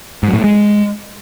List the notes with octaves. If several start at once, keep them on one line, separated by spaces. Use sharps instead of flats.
G#2
F#3
A2
A3
G#3